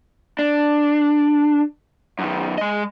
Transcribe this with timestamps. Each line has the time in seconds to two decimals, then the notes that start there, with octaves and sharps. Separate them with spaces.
0.39 D4
2.19 F#2 D#3
2.58 G#3 D#5